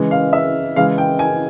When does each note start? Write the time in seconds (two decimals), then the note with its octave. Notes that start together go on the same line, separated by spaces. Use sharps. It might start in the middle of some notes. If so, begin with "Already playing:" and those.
Already playing: C#3 E3 G#3
0.11 F5
0.33 E5
0.76 C#3 E3 G#3 F5
0.98 G5
1.19 G#5